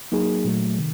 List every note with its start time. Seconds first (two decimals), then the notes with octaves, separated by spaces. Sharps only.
0.12 F#3 A#3 D#4 G#4
0.45 A#2 F#3 A3
0.78 C3 D#3